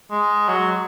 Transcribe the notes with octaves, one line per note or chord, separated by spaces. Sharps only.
G#3
F#3